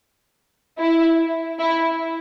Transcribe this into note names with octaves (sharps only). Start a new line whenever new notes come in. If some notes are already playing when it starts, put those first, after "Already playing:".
E4
E4